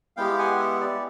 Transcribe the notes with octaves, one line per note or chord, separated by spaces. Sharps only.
G#3 B3 E4 G4 F5 G5
F#5 G#5
E5 F#5
D5 E5